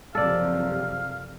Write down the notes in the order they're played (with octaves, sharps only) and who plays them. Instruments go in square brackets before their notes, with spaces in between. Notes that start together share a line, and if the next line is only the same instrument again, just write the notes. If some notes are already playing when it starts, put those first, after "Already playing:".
[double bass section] F#1 C3 F3 [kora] A4 D5 [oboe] F5